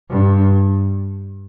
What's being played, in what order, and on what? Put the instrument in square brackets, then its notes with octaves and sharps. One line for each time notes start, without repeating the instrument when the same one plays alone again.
[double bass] G2